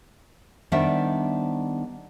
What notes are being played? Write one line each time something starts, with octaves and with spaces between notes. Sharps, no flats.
D#3 G3 B3 D4 C5 E5